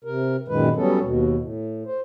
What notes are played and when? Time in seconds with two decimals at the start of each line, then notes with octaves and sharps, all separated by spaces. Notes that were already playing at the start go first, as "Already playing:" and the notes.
0.04 C3 A#4
0.48 F#2 A#2 D#3 G#3 B4
0.76 F#3 G3 B3 C#4 A4
1.02 D#2 B2
1.37 A2
1.86 C5